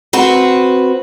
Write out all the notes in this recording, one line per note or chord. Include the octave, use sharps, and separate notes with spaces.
C4 F#4 B4